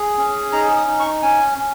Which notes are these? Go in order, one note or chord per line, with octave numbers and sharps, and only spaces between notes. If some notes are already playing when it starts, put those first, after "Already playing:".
Already playing: G#4
C#4
D#4 A#5
D#6
D#4
C#6
C#4 G#5
C#4